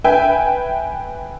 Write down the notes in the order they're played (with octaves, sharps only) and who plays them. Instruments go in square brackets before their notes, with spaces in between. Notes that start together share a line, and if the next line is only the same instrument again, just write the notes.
[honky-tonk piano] B4 E5 G5 G#5